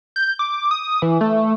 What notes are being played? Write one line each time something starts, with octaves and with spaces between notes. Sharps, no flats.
G6
D6
D#6
E3
A3